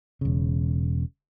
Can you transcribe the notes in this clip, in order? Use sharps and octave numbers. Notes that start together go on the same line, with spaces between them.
E1 C#3